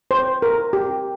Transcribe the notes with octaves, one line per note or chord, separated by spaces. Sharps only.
C5
A#4
G4